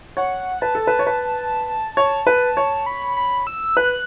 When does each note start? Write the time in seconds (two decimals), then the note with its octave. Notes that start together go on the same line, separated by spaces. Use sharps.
0.17 C#5 F#5
0.62 B4 A5
0.75 A4
0.87 B4
0.99 C#5
1.07 B4
1.97 C#5
2.27 B4
2.57 C#5
2.86 B5
3.17 B5
3.47 E6
3.77 B4 F#6